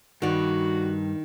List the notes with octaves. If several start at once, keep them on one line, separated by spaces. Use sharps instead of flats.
G2 D#3 F#4 D5